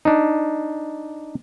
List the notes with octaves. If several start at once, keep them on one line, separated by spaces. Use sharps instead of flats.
D4 D#4